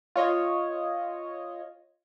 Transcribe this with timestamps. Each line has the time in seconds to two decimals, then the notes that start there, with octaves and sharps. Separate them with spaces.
0.16 F4 C#5 D#5